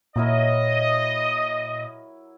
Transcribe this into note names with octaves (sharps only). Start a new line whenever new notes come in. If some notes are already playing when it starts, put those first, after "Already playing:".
A#2 F#3 E4 A#4 D#5